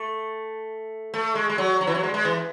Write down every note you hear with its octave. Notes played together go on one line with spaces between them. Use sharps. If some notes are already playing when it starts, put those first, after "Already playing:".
Already playing: A3
A3
G#3
G#3
F#3
F#3
E3
F#3
G#3
G#3
E3